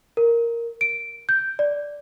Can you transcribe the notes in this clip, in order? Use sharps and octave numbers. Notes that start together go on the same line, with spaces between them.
A#4
D7
G6
D5